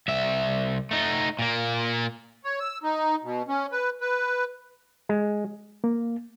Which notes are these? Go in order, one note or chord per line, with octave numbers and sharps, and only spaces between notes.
C2 E5
A3 D#4
A#2 A#3
C#5
E6
D#4
B2
C#4
B4
B4
G#3
A#3